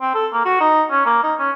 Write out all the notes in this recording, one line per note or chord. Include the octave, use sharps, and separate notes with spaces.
C4
A4
A#3
F#4
D#4
C#4
A#3
D#4
C#4